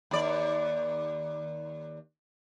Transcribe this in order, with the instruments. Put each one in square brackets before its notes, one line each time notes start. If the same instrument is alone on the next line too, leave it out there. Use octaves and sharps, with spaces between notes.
[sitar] D#2 D5